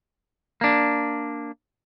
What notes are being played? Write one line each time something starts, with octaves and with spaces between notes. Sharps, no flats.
A#3 D4